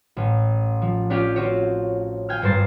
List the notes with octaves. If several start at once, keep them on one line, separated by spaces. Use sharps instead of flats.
A1
F3
C#4 D4 F4 G4
C4 F4 F#4 C#5
F5 G5 G#5 F6
G#1 G2 A#4 C5 A6